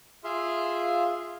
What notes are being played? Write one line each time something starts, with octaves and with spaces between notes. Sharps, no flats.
F4 G#4 E5 F5 C6